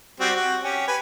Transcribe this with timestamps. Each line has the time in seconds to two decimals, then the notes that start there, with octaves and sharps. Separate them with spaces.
0.20 G3 C4 F#4
0.35 F#4
0.63 C#4 G4
0.88 B4 G#5